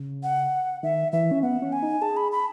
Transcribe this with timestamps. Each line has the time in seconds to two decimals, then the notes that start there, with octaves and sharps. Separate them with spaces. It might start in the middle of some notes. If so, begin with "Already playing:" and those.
Already playing: C#3
0.23 F#5
0.83 D#3 E5
1.12 E3 E5
1.31 C#4
1.43 B3 F#5
1.62 C#4
1.73 G#5
1.82 D#4
2.01 G#4 A5
2.17 B5
2.32 B5